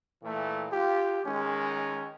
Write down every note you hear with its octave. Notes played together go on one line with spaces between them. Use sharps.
A#2 E3 A3
F4 G4
D#3 G#3 C#4